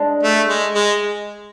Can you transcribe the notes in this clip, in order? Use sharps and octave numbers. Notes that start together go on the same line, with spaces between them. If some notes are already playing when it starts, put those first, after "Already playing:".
Already playing: G#3 D4
A3
G#3
G#3